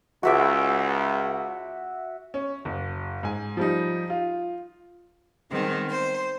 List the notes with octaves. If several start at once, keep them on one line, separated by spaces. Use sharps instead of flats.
C#2 F#4 E5 D6
C#4
F#1
G#2 G#5
F3 G3 D#4
F4
D#3 G3 G#3 B3 C4
C5